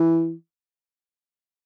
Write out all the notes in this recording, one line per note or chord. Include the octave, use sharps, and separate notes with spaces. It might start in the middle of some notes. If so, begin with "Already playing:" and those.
Already playing: E3